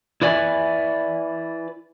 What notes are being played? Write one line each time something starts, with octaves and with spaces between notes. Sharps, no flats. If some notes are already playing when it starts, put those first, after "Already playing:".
E4 B4 D5 E5 G#5